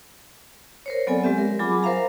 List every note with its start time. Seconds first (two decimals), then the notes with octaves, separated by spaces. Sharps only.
0.86 A#4 C5 C#5
1.07 F#3 B3 C4 A4 D5 G#5
1.23 G#3 C4 G4 E5
1.38 A#4
1.59 F#3 F4 G#4 G#5 B5 D6
1.83 A#4 C5 E5 F5 A#5